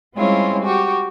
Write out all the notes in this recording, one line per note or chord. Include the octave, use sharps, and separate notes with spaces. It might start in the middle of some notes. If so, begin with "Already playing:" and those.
G3 G#3 C4 C#4 E4 F4
F#4 G4 C#6